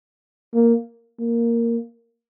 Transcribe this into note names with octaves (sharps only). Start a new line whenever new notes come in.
A#3
A#3